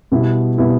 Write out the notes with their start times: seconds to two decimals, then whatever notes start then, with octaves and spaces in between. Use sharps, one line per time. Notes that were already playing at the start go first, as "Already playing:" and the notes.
0.12 B2 G3 B3 E4
0.58 B2 G3 B3 E4